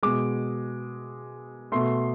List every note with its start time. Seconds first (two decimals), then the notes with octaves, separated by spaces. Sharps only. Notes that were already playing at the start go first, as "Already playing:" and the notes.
0.03 B2 G#3 D6
1.72 B2 A3 C6